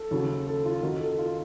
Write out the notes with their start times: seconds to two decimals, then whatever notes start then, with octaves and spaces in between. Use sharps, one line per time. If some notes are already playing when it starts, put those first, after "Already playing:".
Already playing: A4
0.11 D#2 C#3 F#3
0.47 A4
0.65 F4
0.83 F#2 D#3 F#3 A#4
1.01 A4
1.18 F4